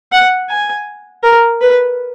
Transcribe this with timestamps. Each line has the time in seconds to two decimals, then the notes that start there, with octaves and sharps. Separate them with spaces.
0.12 F#5
0.49 G#5
1.23 A#4
1.61 B4